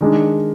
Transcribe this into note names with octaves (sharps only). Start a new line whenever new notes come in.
D#3 G#3 D4